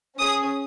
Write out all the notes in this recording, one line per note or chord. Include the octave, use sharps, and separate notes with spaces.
C#4 G#4 D#6